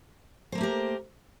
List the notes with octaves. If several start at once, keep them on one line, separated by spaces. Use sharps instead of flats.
A3 A#3 G4 A#4 C5